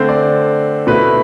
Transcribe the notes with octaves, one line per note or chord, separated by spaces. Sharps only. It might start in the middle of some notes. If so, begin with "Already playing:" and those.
Already playing: D3 A3 C4 C5
D5
B2 A3 E4 B4